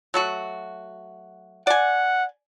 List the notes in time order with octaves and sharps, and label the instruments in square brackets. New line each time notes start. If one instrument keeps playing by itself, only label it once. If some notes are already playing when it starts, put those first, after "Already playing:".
[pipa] F#3 A3 F#4
[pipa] D5 G#5 [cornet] F#5